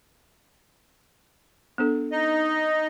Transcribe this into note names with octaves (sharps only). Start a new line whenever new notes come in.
B3 D4 A4
D#4 D#5